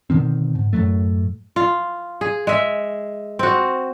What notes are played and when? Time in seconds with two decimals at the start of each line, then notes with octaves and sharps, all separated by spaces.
0.10 B2 D3 D#3 C4
0.55 G#2
0.73 F#2 A2 F#3 A3
1.56 F4
2.21 G#4
2.47 G#3 E5
3.39 C4 F#4